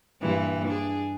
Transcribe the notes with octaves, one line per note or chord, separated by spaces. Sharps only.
G2 A#2 E3
D4 G#4